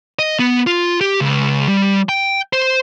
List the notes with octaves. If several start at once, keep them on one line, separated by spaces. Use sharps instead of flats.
D#5
B3
F4
G4
C#2
G3
G5
C5